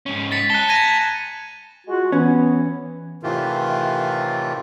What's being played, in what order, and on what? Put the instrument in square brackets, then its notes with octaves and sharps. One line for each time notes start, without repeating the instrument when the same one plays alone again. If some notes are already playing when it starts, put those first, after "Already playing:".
[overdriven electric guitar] G#2 C#4
[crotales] A6 B6 C#7
[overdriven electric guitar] G#5 A5 [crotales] F#6 C#7 G7
[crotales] G#6 A#6 D#7
[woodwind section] G#3 F4 [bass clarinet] F#4
[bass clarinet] E3 [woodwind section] B3 [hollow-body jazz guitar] C#4
[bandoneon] A2 C3 D#3 E3 F4